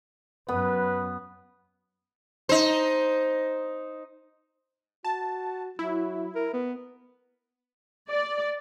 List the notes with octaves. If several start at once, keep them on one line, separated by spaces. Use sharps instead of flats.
F#2 B3 B4
D#4 C5
F#4 A5
F#3 E4
A#4
B3
D5